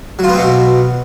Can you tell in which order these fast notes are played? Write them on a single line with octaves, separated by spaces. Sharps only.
F#3 F4 B3 C4 B2